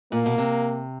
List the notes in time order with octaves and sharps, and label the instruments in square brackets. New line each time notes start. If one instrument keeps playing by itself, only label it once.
[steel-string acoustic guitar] A#2 [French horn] A#3
[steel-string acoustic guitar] B2
C3